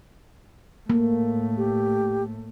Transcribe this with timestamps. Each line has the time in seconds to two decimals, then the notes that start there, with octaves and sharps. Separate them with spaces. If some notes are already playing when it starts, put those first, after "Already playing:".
0.90 A2 A3 A#3
1.57 G4